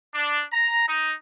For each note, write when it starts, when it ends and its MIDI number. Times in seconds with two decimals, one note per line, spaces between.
0.15 0.43 62
0.53 0.85 82
0.88 1.14 63